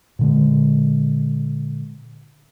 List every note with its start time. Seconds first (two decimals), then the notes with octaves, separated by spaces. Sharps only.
0.19 A#2 D3 G#3